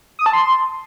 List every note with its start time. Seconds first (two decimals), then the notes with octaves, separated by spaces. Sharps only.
0.19 D#6
0.26 A5
0.33 C6